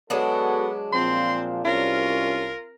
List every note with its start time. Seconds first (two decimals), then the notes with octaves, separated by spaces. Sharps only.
0.10 F#3 G#3 B3 D4 F#4 A4
0.93 A#2 F3 C4 C6
1.65 C2 C#4 F4 A#4